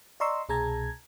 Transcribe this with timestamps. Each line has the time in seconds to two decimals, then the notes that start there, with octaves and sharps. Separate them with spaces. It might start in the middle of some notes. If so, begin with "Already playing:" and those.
0.20 D5 D#5 A#5 C6 C#6 E6
0.49 C2 B2 G#4 A5 A#5 G#6